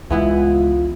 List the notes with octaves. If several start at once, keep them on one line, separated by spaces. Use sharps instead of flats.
C#2 E3 G#3 B3 E4 F4